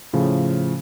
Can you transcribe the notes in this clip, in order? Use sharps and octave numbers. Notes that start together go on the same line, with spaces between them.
A2 C#3 F3